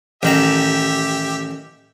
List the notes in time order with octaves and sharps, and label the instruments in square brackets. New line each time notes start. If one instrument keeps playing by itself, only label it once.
[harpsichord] A1 D#3 A#5 [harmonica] G4 E5